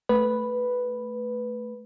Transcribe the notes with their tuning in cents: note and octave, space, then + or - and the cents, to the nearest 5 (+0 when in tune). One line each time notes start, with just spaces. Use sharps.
A3 +0 B4 +0